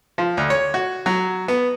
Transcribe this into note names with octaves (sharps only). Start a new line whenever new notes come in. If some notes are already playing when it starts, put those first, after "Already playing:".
F3
D2
C#5
F#4
F#3
B3